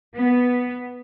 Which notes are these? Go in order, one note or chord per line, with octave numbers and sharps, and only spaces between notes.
B3